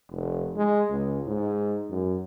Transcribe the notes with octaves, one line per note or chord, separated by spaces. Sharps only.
F1
G#3
C#2
G#2
F#2